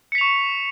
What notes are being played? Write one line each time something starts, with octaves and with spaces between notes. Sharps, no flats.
C#6 B6 C#7 F7